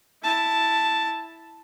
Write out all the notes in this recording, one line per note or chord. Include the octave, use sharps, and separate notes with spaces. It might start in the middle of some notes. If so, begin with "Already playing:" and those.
E4 A5